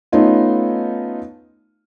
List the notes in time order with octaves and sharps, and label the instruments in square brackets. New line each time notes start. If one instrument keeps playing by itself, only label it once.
[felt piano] A3 B3 C#4 D#4 F4